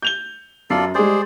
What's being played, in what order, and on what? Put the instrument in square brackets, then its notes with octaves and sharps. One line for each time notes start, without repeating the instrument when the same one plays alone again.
[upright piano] G6 F7 G7
[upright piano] F#2 C7 [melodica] F4 A4 D5
[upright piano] G3 G#3 [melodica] G#4 C5 D5